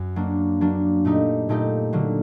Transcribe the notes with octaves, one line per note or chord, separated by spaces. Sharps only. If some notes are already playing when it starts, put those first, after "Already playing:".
Already playing: F#2
F#3 A#3 D4
F#3 A#3 D4
A#2 A3 D#4 G4
A#2 A3 D#4 G4
D3 F#3 A#3